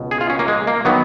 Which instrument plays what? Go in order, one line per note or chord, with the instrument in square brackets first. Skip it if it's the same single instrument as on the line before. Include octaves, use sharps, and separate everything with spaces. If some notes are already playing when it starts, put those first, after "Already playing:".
Already playing: [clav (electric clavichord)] C#2 B2
G#4
F4
C#4
A#3
G#3
A#3
D#3 F#3 B3